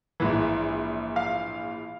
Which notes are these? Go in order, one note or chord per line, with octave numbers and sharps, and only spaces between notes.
A#1 G#2 E3
F5